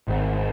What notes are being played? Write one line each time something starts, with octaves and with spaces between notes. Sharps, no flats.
G#1